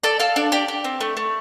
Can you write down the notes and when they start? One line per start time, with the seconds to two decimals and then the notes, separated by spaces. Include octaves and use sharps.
0.03 A4 D5
0.20 A4 F5
0.36 D4 D5
0.52 G4 D5
0.68 G4
0.84 C4
1.00 A3
1.17 A3